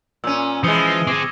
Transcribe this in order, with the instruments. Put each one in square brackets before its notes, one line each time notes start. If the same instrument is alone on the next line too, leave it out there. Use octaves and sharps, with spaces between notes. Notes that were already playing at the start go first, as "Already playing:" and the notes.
[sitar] A#2 C#4 [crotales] E6 D#7
[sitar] E3 G#3 [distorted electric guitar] F3 [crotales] D#6 C#7 G7
[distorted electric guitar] C4 G#4 [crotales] D6 G#6 A#6